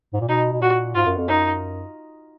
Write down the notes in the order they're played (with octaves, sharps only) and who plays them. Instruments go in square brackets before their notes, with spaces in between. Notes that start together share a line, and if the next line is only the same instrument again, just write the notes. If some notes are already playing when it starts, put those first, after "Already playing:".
[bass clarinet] G#2
A#2
[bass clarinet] B2 [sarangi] D#4
[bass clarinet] B2
[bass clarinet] A#2 [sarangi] F#4
[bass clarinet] G#2 [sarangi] F4
[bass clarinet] F#2
F2
[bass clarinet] F#2 [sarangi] D#4